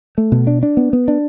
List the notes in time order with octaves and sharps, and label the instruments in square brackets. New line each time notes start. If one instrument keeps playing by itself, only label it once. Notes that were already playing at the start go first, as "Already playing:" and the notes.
[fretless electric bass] A3
B2
D4
D4
B3
B3
D4